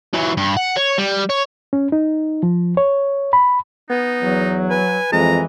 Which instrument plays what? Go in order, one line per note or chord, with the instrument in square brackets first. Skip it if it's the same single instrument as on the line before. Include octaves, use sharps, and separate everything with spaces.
[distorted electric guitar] E3 F#3
G2
F#5
C#5
G3
C#5
[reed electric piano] C#4
D#4
F3
C#5
B5
[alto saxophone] B3 [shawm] D#4
[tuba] E2 [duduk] F#3
[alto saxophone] B4 [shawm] G#5
[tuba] F2 [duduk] E3 [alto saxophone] G#3 [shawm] A#5